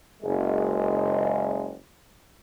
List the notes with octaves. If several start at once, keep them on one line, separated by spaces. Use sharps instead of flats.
F#1 G#3